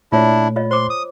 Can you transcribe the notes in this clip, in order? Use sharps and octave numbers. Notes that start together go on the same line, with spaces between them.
A#2 A3 D4 E4 F4 C#5
F4 C#5 D#5
C5 C6 D6
D#6